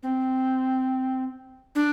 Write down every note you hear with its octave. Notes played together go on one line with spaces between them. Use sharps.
C4
D4